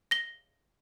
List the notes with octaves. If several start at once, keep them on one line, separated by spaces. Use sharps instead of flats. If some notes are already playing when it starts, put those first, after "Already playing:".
A#6 G7